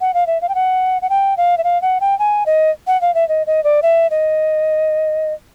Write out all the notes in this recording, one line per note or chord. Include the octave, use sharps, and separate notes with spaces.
F#5
F5
E5
F5
G5
F#5
F#5
G5
F5
E5
F5
F#5
G5
G#5
D#5
F#5
F5
E5
D#5
D#5
D5
E5
D#5